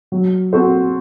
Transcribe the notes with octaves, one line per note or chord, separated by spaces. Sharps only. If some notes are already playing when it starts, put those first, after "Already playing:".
F#3
C4 F#4 A4 C5